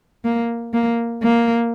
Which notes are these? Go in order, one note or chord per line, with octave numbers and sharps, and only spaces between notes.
A#3
A#3
A#3